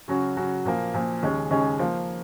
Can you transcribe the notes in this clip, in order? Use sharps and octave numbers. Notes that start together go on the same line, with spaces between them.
C#3 F#3 C#4 F#4
C#3 F#3 C#4 F#4
A#2 F3 A#3
A#2 F3 A#3
D#2 C#3 G#3 C#4
D#2 C#3 G#3 C#4
F3 A#3 F4